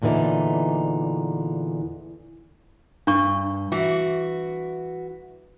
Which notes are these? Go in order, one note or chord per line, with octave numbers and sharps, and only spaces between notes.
E2 A#2 D3 E3 D#4
G2 D4 C#6
E3 F#4